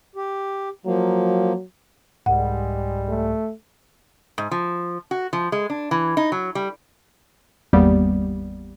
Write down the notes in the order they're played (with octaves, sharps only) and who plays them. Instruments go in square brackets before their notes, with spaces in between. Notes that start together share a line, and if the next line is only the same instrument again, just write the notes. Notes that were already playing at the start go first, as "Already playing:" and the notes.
[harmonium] G4
[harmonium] F3 A#3 [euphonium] F#3
[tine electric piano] C2 G#2 [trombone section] G3 G#3 [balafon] F#5
[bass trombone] A3
[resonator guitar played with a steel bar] G#2
F3
F#4
F3
G#3
D4
E3
D#4
F#3
G3
[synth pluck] G#1 E2 G3 A#3 B3